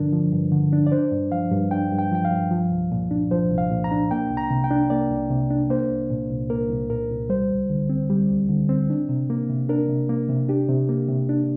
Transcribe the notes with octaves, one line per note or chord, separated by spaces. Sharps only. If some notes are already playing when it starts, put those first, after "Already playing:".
Already playing: G2 D3 F3 D4 A#4
F3
G2
D3
D4
D5
D4 C5
G2
F3 F5
G2
D4 G5
G2
G5
F3 G5
F5
G2
F3
C2
A#2
D4
F3 C5
C2
F5
A#2
A#5
D4
A#3 G5
C2
A#5
C3
G5
D4
A#3 D5
C2
C3
D4
A#3 C5
C2
A#2
C2
A#3 A#4
C2
A#2 A#4
C2
G3 C5
D2
D3
C4
G3
D2
D3
C4
D4
C3
A#3
C3
D4 A#4
C3
A#3
C3
D4 G4
C3
A#3
C3
D4